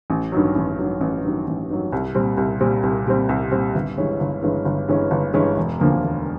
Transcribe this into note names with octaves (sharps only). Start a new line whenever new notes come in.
A1
G2 D#3 F#3
A1
G2 D#3 F#3
A1
G2 D#3 F#3
A1
G2 D#3 F#3
C2
A#2 G3 C4
C2
A#2 G3 C4
C2
A#2 G3 C4
C2
A#2 G3 C4
G1
G2 E3 G#3 C#4
G1
G2 E3 G#3 C#4
G1
G2 E3 G#3 C#4
G1
G2 E3 G#3 C#4
E1
D2 D3 F3 A#3
E1